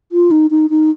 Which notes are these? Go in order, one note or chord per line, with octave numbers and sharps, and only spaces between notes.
F4
D#4
D#4
D#4